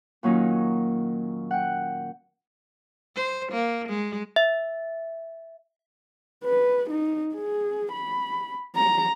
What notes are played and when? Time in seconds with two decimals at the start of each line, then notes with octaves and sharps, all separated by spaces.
0.23 A#2 D#3 F#3 A#3 C#4 D#4
1.51 F#5 G5
3.16 C5
3.52 A#3
3.89 G#3
4.36 E5
6.44 B4
6.90 D#4
7.34 G#4
7.92 B5
8.75 A#5